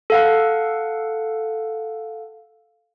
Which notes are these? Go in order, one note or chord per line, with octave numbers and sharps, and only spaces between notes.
A4 F5 F#5